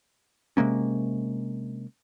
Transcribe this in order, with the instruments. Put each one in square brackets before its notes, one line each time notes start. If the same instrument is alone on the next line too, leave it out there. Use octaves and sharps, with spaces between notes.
[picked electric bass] C3 G#3 A#3 C#4